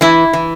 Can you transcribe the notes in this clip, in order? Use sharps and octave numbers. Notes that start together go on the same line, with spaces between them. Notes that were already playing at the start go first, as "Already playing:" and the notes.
E3 E4
E3